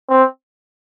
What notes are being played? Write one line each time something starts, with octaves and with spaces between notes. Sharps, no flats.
C4